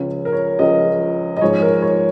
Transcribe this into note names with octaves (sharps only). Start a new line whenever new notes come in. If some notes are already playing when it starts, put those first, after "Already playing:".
Already playing: C#2 C#3 F3 C#5
A#4
C#5
C#2 C#3 F3 D#5
D#5
G#2 F3 G#3 C#5
A#4
C#5